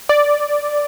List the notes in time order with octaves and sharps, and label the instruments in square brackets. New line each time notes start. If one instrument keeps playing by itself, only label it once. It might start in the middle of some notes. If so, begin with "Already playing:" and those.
[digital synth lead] D5